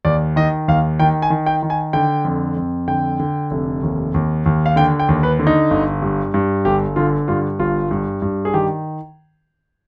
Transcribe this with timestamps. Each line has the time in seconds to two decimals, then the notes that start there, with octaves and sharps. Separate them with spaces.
0.05 D#2 D5
0.36 D#3 D#5
0.68 D#2 F5
1.00 D#3 G5
1.22 G#5
1.30 D#3
1.46 G5
1.63 D#3
1.70 G#5
1.93 D3 G5
2.25 F2
2.56 F2
2.88 D3 G5
3.20 D3
3.51 F1
3.83 D#2
4.14 D#2
4.46 D#2
4.66 F5
4.76 D3 G5
5.00 G5
5.09 D#2
5.23 B4
5.39 D3
5.47 D#4
5.71 G1
6.02 G2
6.34 G2
6.65 G1 G4
6.96 D3 F4
7.28 G2 F4
7.59 G1 F4
7.91 G2
8.22 G2
8.45 G#4
8.54 D#3 G4